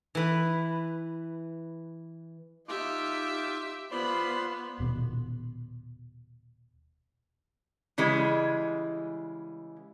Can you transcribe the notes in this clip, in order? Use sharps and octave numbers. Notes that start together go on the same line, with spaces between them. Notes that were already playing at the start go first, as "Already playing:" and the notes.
E3 B4
D#4 F4 G4 E5 D6
B3 F4 C5 D5 B5 C6
D#1 B2
C#3 E3 G3 G#3